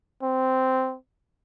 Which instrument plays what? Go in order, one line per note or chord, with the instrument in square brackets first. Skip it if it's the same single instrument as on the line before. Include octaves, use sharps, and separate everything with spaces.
[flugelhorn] C4